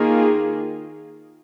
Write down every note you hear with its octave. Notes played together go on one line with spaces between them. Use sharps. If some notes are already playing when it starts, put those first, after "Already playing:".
Already playing: D#3 A#3 F4 G#4